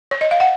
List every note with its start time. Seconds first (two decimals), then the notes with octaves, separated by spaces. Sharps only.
0.11 C#5
0.21 D#5
0.31 F5
0.40 F#5